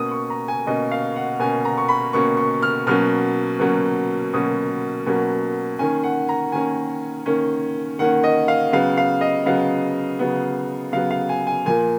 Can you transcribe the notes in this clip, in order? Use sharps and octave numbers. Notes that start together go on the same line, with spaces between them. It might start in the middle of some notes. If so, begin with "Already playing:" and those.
Already playing: B2 A#3 C#4 D#6
C#6
A#5
G#5
B2 A#3 C#4 D#5
F5
F#5
B2 A#3 C#4 G#5
A#5
C#6
B5
B2 A#3 C#4 C#6
C#6
F6
B2 F#3 A#3 C#4 F6
B2 F#3 A#3 C#4
B2 F#3 A#3 C#4 D#6
B2 F#3 A#3 C#4
D#3 A#3 C#4 G#5
F#5
A#5
D#3 A#3 C#4 G#5
D#3 A#3 C#4
D#3 A#3 C#4 F#5
D#5
F5
C#3 F#3 B3 F5
F5
D#5
C#3 F#3 B3 F5
C#3 F#3 B3
C#3 F#3 B3 F5
F5
G#5
G#5
A#2 F3 A#3 G#5